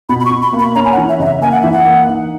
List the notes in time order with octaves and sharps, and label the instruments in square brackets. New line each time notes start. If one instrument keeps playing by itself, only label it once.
[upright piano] B2 [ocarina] B5
[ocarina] B5
C#6
[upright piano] B2
[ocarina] B5
[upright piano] A#3
[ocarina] B5
[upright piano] C#4 [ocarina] A#5
[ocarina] G#5
F#5
[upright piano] E3
[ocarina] E5
[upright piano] C#3 [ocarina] D#5
[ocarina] E5
[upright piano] A#3 [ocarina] G#5
[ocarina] F#5
[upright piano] E3 [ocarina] E5
[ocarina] F#5
[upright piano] A#3
D#4